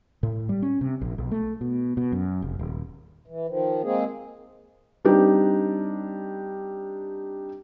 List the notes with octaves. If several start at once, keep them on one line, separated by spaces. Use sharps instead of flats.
A2
G3
C#4
C3
A#1
B1
A3
B2
B2
F#2
F1
D#1
E3
D#3 F3
G#3 A#3 C4 G#4
G3 C4 D4 D#4 G4